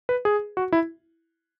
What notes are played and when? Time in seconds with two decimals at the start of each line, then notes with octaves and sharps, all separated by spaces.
0.09 B4
0.25 G#4
0.57 F#4
0.72 E4